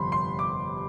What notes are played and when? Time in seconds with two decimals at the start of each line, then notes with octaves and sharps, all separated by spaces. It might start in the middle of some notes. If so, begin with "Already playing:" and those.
Already playing: G1 F2 C3 B5 C6
0.12 C6
0.39 D6